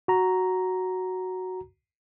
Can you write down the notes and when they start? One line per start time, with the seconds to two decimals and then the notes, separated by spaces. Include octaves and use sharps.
0.08 F#4 A#5